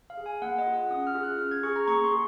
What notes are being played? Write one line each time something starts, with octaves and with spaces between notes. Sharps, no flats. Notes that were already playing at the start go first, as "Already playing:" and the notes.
F5
G#4
G#5
A#3 F#5
D#5
F4 G#4
F#5
C#4 D#6
F6
F4 G#4
F#6
C#4 F6
G#6
G#4 C#6
A#5
A#3 C#6
C6
G#4